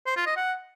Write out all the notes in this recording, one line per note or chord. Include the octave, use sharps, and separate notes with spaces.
C5
F4
D#5
F#5